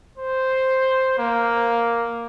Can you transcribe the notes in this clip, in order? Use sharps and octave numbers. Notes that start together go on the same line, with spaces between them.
C5
A#3